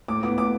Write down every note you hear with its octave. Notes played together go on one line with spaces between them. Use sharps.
A2 D6
B3 D6
A2 D6